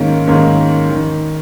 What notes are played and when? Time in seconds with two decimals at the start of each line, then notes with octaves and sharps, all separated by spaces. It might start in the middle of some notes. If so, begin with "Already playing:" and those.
Already playing: G#2 D#3 A#3 C#4
0.28 G#2 D#3 A#3 C#4
0.91 D#3